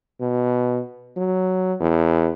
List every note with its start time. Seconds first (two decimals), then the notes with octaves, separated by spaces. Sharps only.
0.20 B2
1.17 F#3
1.80 E2